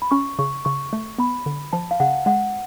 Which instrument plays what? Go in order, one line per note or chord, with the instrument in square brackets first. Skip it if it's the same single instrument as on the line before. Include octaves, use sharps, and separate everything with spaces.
[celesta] B5
[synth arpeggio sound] C#4 [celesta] C#6
[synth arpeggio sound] C#3 [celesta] C#6
[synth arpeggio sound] C#3 [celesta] C#6
[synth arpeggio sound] A3
[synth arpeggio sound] B3 [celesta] B5
[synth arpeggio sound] D3
[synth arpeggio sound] F3 [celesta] A5
[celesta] F5
[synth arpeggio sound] C#3 [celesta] F#5
[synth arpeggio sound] G#3 [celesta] F#5